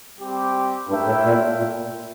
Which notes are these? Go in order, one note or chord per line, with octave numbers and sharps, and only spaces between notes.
G3 C4 G4
G2 A3 E4 A#4 E5 G5
A2
A#2
A#2